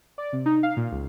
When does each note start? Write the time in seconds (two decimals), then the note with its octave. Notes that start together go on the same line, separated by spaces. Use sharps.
0.18 D5
0.33 C3
0.46 D#4
0.63 F5
0.77 A#2
0.92 C#2